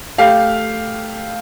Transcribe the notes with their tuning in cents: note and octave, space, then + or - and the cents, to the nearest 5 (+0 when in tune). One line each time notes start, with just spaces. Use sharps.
A3 +0 G4 +0 F5 +0